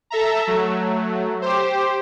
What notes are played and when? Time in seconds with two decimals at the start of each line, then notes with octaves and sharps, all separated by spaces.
0.10 A4 E5 A#5
0.47 F#3 A3
1.42 G4 C5